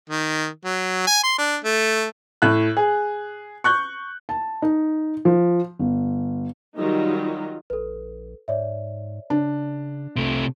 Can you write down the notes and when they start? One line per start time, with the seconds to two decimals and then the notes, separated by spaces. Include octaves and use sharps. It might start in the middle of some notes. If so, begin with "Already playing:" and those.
0.10 D#3
0.65 F#3
1.07 G#5
1.23 C6
1.38 D4
1.64 A3
2.42 A2 F#6
2.77 G#4
3.64 C#6 F#6 G6
4.29 A5
4.62 D#4
5.25 F3
5.79 G1
6.77 D#3 F#3 G3 D#4 F4
7.70 A#1 A4 B4
8.48 G#2 C#5 D5 E5
9.30 C#3 D4
10.16 C2 C3 A3